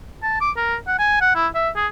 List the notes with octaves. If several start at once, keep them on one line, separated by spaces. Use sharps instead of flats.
A5
D6
A#4
F#5
G#5
F#5
E4
E5
G#4